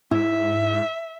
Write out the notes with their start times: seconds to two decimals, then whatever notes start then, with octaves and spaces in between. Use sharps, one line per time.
0.11 G#2 E4 E5